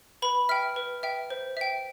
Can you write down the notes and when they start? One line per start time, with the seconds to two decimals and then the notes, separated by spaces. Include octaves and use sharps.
0.22 B4 B5
0.49 E5 G5 F6
0.76 B4
1.03 E5 G5
1.30 C5
1.57 E5 G5